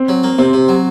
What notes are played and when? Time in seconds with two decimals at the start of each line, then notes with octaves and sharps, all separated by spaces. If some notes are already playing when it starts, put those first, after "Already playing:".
Already playing: C4
0.09 F#3
0.23 A#3
0.39 C3 C4
0.53 C3
0.68 F#3